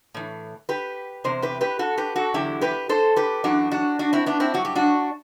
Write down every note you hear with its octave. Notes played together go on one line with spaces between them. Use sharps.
A2 E3
G4 B4
E2 C3 C5
G4 B4
G4 B4
F#4 A4
G4 B4
F#4 A4
E2 D3 F#3 E4 G4
G4 B4
A4 C5
G4 B4
F#2 E3 D4 F#4
D4 F#4
D4 F#4
C4 E4
B3 D4
C4 E4
G2 F#3 F#4
G4
D4 F#4